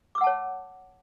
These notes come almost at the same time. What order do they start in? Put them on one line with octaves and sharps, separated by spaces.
D6 E6 F#5 A5 C#5